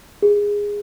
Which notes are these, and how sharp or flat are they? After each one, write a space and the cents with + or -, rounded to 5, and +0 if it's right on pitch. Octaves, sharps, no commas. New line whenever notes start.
G#4 -15